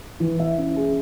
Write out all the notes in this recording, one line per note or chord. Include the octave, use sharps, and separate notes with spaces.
E3
E5
C#4
G#4